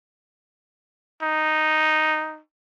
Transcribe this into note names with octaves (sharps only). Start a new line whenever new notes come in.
D#4